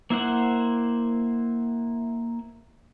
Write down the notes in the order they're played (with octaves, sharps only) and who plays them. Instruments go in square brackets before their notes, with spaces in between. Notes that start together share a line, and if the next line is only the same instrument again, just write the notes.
[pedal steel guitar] A#3 E4 C5 F#5